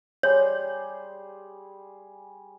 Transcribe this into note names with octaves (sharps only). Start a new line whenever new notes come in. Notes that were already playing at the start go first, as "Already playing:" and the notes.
G3 G#4 C#5 C6